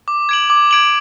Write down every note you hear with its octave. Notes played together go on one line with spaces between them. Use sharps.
D6
G#6 D7 F#7
D6
G#6 D7 F#7